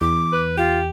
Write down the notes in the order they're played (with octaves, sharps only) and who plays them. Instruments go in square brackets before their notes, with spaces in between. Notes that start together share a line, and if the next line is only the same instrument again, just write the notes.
[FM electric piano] E2 [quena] D6
[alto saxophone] B4
[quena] F4 [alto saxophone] G4